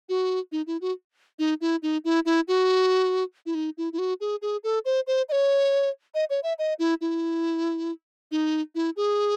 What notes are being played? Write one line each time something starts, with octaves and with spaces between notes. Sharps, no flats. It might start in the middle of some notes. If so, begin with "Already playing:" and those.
F#4
D#4
E4
F#4
D#4
E4
D#4
E4
E4
F#4
E4
D#4
E4
E4
F#4
G#4
G#4
A4
C5
C5
D#5
C#5
D#5
C#5
E5
D#5
E4
E4
D#4
E4
G#4